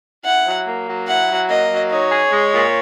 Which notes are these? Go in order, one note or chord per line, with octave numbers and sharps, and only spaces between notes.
E4 F#5
F#3
A#3
F#3
E4 F#5
F#3
A#3 D#5
F#3
D#4 C#5
G#4
G#3
A#2